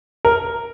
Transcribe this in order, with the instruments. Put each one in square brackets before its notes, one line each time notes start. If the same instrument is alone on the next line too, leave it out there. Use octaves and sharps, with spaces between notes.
[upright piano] A#4